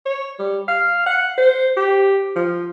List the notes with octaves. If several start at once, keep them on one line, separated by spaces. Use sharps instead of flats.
C#5
G3
F5
F#5
C5
G4
F3